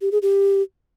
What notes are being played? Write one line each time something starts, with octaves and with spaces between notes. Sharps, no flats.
G4
G#4
G4